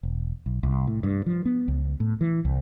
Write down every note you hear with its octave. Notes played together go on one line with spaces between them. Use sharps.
E1
B1
C2
A2
G2
F3
B3
C#2
A2
E3
C2